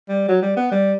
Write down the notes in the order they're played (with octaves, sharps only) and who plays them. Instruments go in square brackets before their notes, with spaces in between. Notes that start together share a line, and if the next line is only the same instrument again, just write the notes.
[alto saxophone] G3
F#3
G3
B3
G3